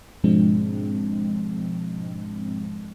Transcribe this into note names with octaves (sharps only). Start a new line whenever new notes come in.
G#2 B2 F3 G#3 C4 D4